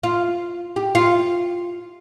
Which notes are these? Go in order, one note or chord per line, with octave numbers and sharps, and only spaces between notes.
F4
G4
F4